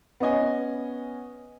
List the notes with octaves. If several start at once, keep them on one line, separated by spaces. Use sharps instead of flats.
B3 C#4 D#5 G#5